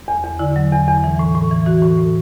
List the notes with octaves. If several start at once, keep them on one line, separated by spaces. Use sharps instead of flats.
E2
E2
D3 E4
F#3
E2
E2
E3
A2
A2
E3
E3 F#4
A2
A2